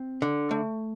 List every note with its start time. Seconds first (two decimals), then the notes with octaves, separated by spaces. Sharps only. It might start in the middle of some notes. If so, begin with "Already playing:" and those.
Already playing: C4
0.22 D3
0.51 A3